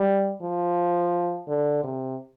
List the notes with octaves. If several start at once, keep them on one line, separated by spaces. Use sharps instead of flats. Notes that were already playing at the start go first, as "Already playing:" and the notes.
Already playing: G3
F3
D3
C3